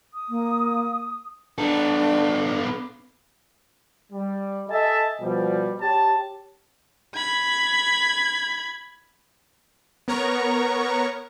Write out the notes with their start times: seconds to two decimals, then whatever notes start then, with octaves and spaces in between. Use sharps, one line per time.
0.15 D#6
0.29 A#3
1.58 B3 D4 A4
4.12 G3
4.69 A4 D#5 E5 G#5 A5
5.21 B2 F3 G3
5.81 G4 C#5 A5
7.15 B5 G#6
10.08 B3 A#4 C#5 A#5 C#6